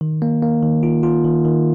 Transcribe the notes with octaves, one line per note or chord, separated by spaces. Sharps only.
D#3
A#3
A#3
D#3
F4
F4
D#3
D#3